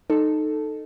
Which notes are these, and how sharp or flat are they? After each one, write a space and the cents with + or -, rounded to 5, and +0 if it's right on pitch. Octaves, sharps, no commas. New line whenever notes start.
D#4 -15 A4 +0